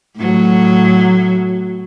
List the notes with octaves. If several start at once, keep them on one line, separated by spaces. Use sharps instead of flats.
A2 F#3